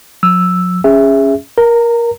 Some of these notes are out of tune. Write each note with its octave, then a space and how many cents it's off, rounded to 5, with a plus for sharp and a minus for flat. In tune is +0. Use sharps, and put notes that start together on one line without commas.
F#3 -45 E6 +0
C#4 +0 G#4 -15 E5 +0
A#4 +15 A#5 -25